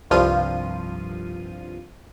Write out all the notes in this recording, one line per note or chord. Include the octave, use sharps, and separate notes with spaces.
C2 G2 F3 F4 D#7